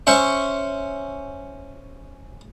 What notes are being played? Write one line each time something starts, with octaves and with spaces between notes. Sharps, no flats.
C#4 C5 E5 C#6